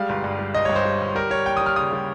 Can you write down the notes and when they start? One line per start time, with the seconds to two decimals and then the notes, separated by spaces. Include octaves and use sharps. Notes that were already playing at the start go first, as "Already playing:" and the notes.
Already playing: G3 G#3 F5
0.09 G1
0.24 G2
0.39 G3
0.54 G1 D#5
0.65 C#5
0.69 G2
0.75 C5
0.85 G3
1.01 G1
1.15 G3 A#4
1.30 G3 C#5
1.46 D#2 G5
1.57 D#6
1.61 G3
1.66 F6
1.76 C#3 D#6
1.93 G3